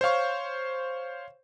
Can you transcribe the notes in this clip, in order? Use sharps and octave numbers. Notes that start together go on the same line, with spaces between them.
C5 C#5 F5 C#6